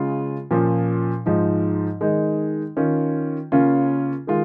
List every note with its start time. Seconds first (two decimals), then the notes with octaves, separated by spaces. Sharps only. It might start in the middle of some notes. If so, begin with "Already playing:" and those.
Already playing: C#3 G#3 F4
0.51 A#2 F3 C#4
1.26 G#2 F3 G#3 D#4
2.01 D#3 G#3 D#4
2.77 D#3 C#4 F4
3.52 C#3 A#3 C#4 F4
4.27 D#3 G#3 F4